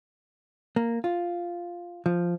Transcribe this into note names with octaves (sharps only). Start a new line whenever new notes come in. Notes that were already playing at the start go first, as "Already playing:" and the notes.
A#3
F4
F3